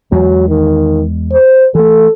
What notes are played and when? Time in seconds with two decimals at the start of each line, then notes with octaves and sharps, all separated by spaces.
0.12 E2 F#3 G#3
0.49 D#3
1.33 C5
1.75 E3 A3 A4